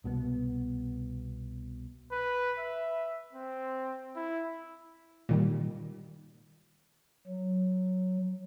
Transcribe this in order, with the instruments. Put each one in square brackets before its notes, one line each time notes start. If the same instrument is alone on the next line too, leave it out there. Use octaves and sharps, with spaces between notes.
[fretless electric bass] C2 B2 D#3 B3
[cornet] B4
E5
C4
E4
[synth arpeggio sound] A#2 D#3 G3
[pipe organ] F#3